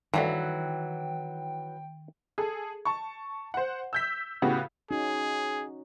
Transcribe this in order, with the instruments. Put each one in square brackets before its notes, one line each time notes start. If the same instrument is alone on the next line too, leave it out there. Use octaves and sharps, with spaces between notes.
[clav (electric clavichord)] D2 G2 [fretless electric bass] D#3 [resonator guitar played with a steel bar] E3 F#3 [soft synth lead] G5
[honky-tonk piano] G#4 A4
A5 C#6
C5 F#5
E6 G6 B6
A2 C#3 B3 F#4 G4
[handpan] C#4 D#4 F#4 [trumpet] G#4